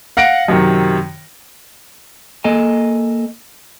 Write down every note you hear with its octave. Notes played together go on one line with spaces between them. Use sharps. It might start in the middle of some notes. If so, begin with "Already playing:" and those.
F5 F#5 A#6 C#7 D7
F#2 C3 D#3
A#3 A4 D#5 G#5